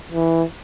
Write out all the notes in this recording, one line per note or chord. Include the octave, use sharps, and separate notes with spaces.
E3